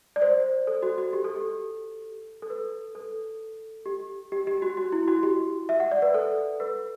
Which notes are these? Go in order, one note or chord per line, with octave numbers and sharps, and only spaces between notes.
D5
C5
A4
F#4
F#4
G4
A4
G4
A4
B4
A4
G4
G4
G4
F#4
F#4
E4
F#4
G4
E5
F#5
D5
B4
A4
B4